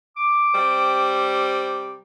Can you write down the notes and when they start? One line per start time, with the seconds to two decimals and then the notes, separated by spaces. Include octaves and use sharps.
0.17 D6
0.54 C3 G3 C5